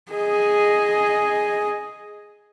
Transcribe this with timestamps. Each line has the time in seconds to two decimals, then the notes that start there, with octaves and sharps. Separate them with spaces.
0.12 G#4 D#5